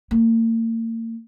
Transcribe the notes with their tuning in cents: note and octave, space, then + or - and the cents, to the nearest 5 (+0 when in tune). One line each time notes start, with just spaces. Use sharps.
A#3 -40